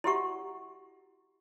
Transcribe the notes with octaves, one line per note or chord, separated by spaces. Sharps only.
E4 F#4 G4 E5 F#5 C#6